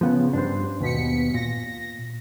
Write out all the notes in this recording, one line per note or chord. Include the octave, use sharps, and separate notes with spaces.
C#3 F3 B3
G2 D4 C5
D#2 B2 B6 C#7
A#2 A#6